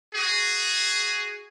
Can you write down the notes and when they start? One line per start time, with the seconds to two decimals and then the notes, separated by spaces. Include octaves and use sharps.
0.14 F#4 G#4